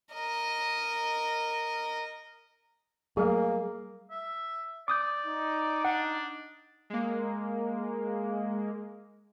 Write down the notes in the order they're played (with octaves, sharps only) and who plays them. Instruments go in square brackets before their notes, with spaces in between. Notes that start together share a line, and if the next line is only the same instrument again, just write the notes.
[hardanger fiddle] A#4 D#5
[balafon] F#3 G3 A3 [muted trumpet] A#3 [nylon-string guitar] G#4
[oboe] E5
[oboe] D5 [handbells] D6 D#6 G6
[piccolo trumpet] D#4
[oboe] D4 [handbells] F#5
[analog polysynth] G#3 A#3